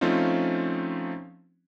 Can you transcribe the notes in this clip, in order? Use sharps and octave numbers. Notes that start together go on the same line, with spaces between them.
F3 A3 C4 C#4 D#4 F4